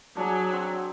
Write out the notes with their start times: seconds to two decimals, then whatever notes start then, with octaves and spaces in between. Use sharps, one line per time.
0.17 F#3 D4 G#4
0.52 C4 D4